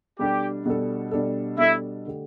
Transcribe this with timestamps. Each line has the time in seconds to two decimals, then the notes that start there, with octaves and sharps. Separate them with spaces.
0.19 B2 G3 D4 G4 A4
0.65 B2 G3 D4 A4
1.11 B2 G3 D4 A4
1.58 B2 G3 D4 E4 A4
2.06 D3 A3 G4